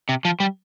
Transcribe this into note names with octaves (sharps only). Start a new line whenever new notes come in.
C3
F3
G3